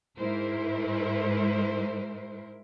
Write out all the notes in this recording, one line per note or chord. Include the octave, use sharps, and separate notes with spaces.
G#2 G#3 E4 A#4 C5